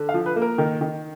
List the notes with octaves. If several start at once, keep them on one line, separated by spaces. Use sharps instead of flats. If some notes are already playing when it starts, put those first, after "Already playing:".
Already playing: D3
F5
F3
B4
A#3
A#4
D#3
D#3